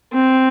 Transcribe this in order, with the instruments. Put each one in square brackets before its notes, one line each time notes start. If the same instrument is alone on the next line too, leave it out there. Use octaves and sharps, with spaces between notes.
[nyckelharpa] C4